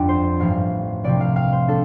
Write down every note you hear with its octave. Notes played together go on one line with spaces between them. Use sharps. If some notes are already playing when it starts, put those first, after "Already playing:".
Already playing: G1 F2 F3 D4 D5
C5
A1 G2 F3 F5
C2 C3 F3 D5
F5
F5
C5
A3 D4 A4